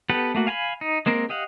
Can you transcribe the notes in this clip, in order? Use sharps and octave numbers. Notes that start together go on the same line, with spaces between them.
B3 G4 A4 B4 F#5
A3 A#3 F#4
F5 G#5 A#5 B5
D#4
G#3 A#3 C4 A#4
G4 D#5 F5 F#5